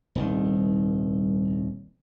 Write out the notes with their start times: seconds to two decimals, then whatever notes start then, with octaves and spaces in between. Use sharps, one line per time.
0.15 D#1 C2 D#3